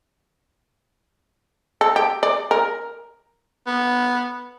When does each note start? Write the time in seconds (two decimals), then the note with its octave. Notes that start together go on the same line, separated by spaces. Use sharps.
1.81 A4
1.96 G4
2.23 D5
2.51 A#4
3.67 B3